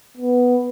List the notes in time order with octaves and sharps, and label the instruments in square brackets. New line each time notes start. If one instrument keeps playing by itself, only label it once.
[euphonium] B3